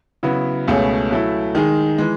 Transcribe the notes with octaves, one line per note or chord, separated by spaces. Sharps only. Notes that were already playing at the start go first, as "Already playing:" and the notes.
C#3 F#3 B3 E4
C#2 B2 A3 C#4 G#4
F#3 A3 E4
D#3 G#3 D#4 G#4
E3 G#3